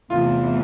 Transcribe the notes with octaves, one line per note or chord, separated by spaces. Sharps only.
E2 C3 E3 A3 F4